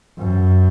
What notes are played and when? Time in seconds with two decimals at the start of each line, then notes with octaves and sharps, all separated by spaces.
0.18 F#2